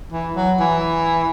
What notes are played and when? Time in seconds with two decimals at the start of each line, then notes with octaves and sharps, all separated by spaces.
0.12 E3
0.36 F#3
0.60 E3